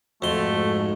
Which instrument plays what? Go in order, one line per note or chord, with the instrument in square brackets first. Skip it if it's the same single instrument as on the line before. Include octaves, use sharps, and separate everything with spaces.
[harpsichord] F2 C6 [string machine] G#2 [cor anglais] A3 [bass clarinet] F#4